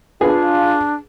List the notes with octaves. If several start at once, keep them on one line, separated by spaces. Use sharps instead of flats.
D4 F4 G#4 B4